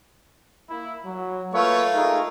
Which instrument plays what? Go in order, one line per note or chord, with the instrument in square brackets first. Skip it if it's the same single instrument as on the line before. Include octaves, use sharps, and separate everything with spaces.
[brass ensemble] A#3 E4
F#3
[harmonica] A3 F4 [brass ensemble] A#3 B4 C#5
[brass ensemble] D#4 G#4 A#4